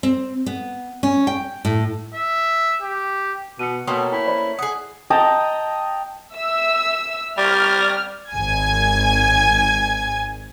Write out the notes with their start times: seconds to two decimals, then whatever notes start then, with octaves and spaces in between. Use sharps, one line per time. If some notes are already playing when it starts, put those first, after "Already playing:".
0.03 C4
0.46 B3
1.03 C#4
1.27 G5
1.65 A2
2.14 E5
2.82 G4
3.59 B2 C#7 D#7
3.87 B2 A3 A#3 C#4 G5 C6 D#6
4.12 E4 G5
4.26 C5 D5 B5
4.59 G#4 F#5 D#6
5.10 D#5 G5 A5 A#5
6.35 E5 E6
7.38 G3 F6
8.32 G#1 G#5 G#6